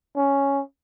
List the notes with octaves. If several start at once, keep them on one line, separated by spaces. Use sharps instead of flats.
C#4